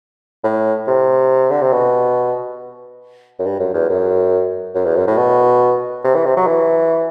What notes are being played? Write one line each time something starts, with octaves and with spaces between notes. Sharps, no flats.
A2
C3
D3
C3
B2
F#2
G2
F#2
E2
F#2
F#2
E2
F#2
A2
B2
C3
E3
C3
F#3
E3